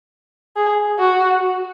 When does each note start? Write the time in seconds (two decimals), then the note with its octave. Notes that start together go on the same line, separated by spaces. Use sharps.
0.56 G#4
0.98 F#4